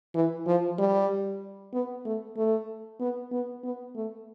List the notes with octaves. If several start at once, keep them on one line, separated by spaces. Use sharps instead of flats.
E3
F3
G3
B3
A3
A3
B3
B3
B3
A3